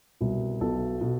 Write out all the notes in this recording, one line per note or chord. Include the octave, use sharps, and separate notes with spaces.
C2 B2
B1 B2 A4
B2